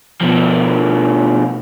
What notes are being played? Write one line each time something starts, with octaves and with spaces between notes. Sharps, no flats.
B2 F3